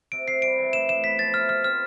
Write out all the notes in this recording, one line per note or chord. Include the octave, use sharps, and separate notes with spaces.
C3 D7
C3 C7
G3 D7
E3
A2 E7
A2 E7
B3 B6
F3 A6
E4 F6
B2 F6
C4 F6